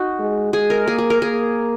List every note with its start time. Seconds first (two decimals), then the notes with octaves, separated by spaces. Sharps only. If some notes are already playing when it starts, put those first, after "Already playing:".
Already playing: D#4 F#4
0.19 G#3
0.53 G#3 G#4
0.70 A#4
0.88 A#3 G#4
0.98 G#4
1.10 A#4
1.21 A#3 G#4